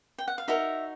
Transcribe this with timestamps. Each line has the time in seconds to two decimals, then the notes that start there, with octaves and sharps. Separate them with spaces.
0.18 G5
0.28 F#5
0.38 F5
0.48 D#4 F#4 A#4 E5